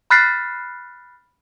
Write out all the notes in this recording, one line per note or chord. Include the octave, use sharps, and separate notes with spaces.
B5 F6 F#6 A6 B6 C7